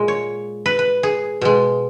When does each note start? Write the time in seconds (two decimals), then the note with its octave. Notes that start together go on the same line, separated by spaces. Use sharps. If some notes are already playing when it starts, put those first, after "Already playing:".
Already playing: A#2 G#3
0.08 C#5
0.66 B4
0.79 B4
1.03 G#4
1.41 B2 G#3